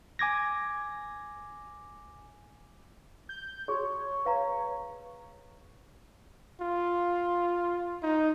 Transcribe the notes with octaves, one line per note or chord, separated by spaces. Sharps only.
G#5 D6 G#6 A#6
G6
F#4 G#4 C#5
B4 F5 A#5
F4
D#4